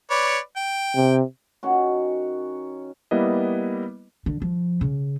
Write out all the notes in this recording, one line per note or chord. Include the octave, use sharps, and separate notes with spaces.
B4 C#5 D5
G5
C3
D#3 C#4 F#4
G3 A#3 B3 E4 B4 D#5
D3
F3
C#3